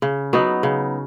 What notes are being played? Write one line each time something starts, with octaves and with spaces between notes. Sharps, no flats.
C#3
F#3 B3 D#4
C#3